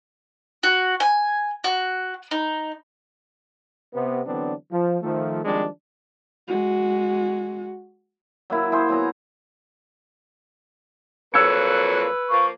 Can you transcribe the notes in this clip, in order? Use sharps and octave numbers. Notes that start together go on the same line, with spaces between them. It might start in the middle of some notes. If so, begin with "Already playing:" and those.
F#4
G#5
F#4
D#4
C3 B3
D3 E3 F#3 B3 C4 D4
F3
D#3 F3 A3
D#3 F3 G3 G#3 C4 D4
G#3 F#4
F#3 A#3 E4
E4 G#4 C5
F#3 B3 C#5 A#5
F2 A#2 F#3 B4 E6 G#6 C#7
F3 A#3 C#6